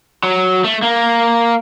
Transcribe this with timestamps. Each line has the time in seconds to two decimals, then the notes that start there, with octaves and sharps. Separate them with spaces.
0.23 F#3
0.64 A3
0.82 A#3